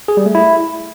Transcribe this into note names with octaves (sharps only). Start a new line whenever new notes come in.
G#4
G3
A3
E4